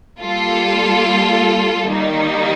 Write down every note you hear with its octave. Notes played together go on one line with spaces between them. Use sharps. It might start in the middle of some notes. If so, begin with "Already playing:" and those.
G3 A#3 F4 A4
D#3 G3 A#3 D#4